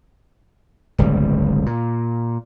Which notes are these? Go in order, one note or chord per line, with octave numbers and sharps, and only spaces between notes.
D1 G1 C#2 G3
A#2